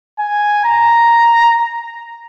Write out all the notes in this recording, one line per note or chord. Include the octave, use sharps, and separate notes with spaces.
G#5
A#5